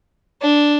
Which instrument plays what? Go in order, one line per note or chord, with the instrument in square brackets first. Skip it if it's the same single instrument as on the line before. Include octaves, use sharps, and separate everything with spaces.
[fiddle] D4